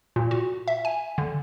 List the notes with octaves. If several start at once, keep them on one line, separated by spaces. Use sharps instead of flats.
A#2
F#4
E5
G#5
D3